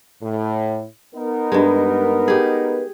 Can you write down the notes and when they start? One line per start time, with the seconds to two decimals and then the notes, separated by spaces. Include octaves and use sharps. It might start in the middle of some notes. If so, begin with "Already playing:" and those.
0.22 A2
1.15 B3 D#4 A#4
1.52 G2 G#3 B4
2.28 G4 G#4